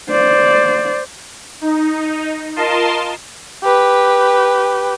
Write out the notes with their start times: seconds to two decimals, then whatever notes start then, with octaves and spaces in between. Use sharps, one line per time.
0.10 C5 D5
1.61 D#4
2.56 F4 A#4 D#5 A5 C6
3.63 G4 B4